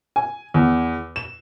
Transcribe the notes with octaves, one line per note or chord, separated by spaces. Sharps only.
G#5
E2
E7